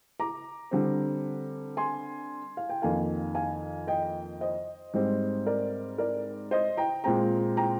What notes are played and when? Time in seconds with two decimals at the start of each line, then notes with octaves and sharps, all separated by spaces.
0.20 A#5 D6
0.71 D3 G3 C4
1.77 G#5 C6
2.57 F5
2.69 G5
2.82 F2 D#3 A#3 F5 G#5
3.35 F5 G#5
3.87 D#5 G5
4.41 C5 D#5
4.94 G#2 G3 C4
5.46 A#4 D5
5.98 A#4 D5
6.51 C5 D#5
6.77 G5 A#5
7.04 A#2 G#3 C4 G5 A#5
7.57 G5 A#5